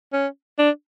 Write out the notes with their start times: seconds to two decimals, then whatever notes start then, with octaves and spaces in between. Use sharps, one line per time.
0.13 C#4
0.59 D4